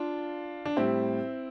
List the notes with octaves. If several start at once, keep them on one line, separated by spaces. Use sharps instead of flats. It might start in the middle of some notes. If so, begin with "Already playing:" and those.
Already playing: D4 F4
D4
A2 G3 C4 E4